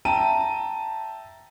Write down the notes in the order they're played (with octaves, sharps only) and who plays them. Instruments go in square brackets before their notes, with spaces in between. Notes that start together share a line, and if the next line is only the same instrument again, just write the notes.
[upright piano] E5 G5 A5 A#5 D#7